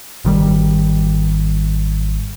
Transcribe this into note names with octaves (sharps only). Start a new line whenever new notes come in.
G#1 D#3 G3